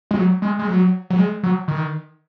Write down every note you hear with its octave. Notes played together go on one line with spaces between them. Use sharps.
G#3
F#3
G#3
G#3
F#3
F#3
G#3
F#3
D#3